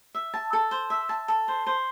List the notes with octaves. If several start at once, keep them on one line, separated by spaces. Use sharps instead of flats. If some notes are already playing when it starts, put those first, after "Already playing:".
E5
A5
A4
C5
E5
A5
A4
C5
C5